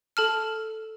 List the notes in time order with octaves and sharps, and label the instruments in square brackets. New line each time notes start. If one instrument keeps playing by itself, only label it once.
[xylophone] A4 A5 F6